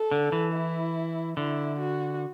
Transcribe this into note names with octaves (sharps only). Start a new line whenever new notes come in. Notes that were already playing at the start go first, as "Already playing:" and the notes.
Already playing: A4
D3
E3
E4
D3 E4
F#4